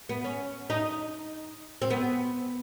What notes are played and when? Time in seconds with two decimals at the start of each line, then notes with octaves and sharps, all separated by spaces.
0.09 B3
0.24 C#4
0.70 D#4
1.82 C4
1.90 B3